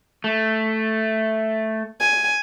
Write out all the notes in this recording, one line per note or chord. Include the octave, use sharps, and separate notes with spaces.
A3
G#5